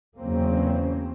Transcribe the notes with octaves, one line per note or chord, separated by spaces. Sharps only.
E2 C#3 F#3 A#3 C4 C#4